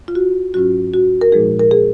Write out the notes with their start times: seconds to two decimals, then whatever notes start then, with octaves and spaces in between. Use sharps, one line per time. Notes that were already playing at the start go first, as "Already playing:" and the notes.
0.08 F4
0.15 F#4
0.54 G#2 F#3 C#4 F4 F#4
0.94 F#4
1.21 A#4
1.32 A#2 F3 G#3 D#4 G#4
1.59 A#4
1.71 G#4